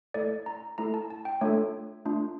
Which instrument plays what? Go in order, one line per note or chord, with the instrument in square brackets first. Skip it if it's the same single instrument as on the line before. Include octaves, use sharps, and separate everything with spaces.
[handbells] A3 E4 A4 D5
A#5
A3 E4 A4 A#5
A5
A5
G5
A3 D4 F4 A4 C#5
A3 D4 F4 A4